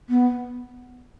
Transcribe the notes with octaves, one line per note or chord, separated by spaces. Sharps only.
B3